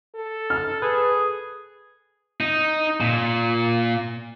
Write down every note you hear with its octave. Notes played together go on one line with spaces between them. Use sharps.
A4
F6
G#4 B4
D#4
A#2